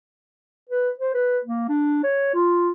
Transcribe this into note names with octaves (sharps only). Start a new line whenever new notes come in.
B4
C5
B4
A#3
D4
C#5
F4